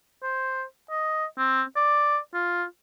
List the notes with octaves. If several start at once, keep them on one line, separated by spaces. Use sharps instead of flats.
C5
D#5
C4
D5
F4